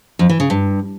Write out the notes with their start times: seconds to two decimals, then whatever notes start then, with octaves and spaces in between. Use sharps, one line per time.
0.19 F2
0.29 E3
0.40 C#3
0.50 G2